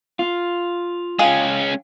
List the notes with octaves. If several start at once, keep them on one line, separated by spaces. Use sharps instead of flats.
F4
G#3 C#4 G#4 F5 G5